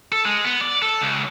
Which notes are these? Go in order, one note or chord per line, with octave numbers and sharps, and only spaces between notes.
A4
G#3
B3
D5
A4
C#2